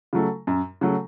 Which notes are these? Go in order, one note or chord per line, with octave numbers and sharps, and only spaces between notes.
C#3 F#3 A3
F#2
C#3 F#3 A3